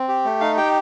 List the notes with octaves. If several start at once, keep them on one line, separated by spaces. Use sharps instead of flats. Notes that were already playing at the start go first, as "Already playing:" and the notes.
Already playing: C4
G4
A3
D#4 F5
G4 G5